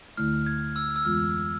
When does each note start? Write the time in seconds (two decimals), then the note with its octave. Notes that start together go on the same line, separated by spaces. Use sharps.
0.17 D2 D3 A3 E4 F6
0.47 G#6
0.76 E6
0.96 E6
1.05 F2 E3 G#3 B3 F4 F6